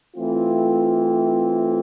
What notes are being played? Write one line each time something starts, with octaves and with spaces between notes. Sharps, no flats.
E3 A3 C4 F4